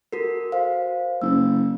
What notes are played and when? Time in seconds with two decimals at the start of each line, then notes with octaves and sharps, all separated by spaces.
0.13 F#4 A4 A#4
0.52 C5 F5
1.22 F#1 E6